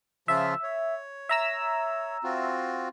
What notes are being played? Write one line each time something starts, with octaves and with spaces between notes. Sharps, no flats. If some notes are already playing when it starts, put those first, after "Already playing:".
C#3 F3 F4 E5
C#5
E5 A#5 E6
C4 F4 F#4